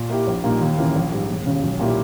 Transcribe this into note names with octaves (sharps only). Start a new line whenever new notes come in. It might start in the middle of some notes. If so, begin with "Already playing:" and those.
Already playing: A#2
A#3 E4 G4
A#1
A#2 G3 A#3 D#4
D#2
C#3 E3 A#3
A#1
G#2 G3
E1
D#2 C#3
B1
A#2 A#3 E4 G4